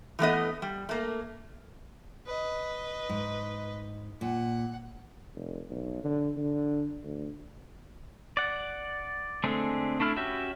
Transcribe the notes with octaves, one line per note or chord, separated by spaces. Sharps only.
E3 A3 B3 D#5
G3
A3 A#3
B4 D#5
G#2
A#2 F#5
F1
B1
D3
D3
D2
D5 F#5
D3 G#3 A3 C4 G#4
A3 D4 E4 F6
C#4 F#4 G4 E5